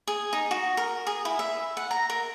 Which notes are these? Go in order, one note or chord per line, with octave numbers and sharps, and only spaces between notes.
G#4
D#4
F#4
A#4
G#4
E4
E5
F#5
A#5
A#4